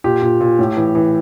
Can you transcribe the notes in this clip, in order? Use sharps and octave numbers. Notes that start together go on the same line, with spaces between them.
A#2 G4
A#2
A#2
A2
E3
E3